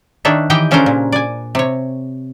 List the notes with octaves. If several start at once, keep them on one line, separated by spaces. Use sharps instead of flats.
D#3 D4 C#5 E5
D#3 E3 G4 D#5 G5
C#3 C#4 D4 A4 A#4 C5
A#2
D5 G#5
C3 C#5